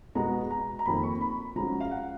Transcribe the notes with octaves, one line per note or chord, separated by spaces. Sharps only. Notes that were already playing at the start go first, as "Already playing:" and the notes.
B2 G#3 B3 F#4 A#5
A#5
A#5
F2 D#3 A#3 B5
C#6
B5
F3 G#3 C#4 F#4 A#5
F5
F#5